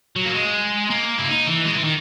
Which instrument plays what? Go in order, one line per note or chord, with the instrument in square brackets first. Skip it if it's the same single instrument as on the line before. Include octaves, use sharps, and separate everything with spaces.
[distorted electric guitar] F#3
A#3
G#3
A#3
E4
D#4
E3
G#3
E3
D#3